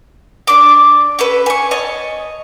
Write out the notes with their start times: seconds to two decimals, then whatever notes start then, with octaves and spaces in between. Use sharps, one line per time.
0.47 D4 D6
1.19 C#4 A4 B4
1.46 G#5 C#6
1.71 C#5 D#5 A5